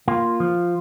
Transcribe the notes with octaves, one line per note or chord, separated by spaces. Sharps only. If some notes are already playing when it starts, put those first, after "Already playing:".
A#3 F4
F3